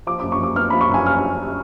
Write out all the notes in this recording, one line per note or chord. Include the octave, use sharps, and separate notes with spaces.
F3 D6
F#2 D6
C#6
F#2 D6
B3 F6
F3 B5
C#6
F#2 G#5
F6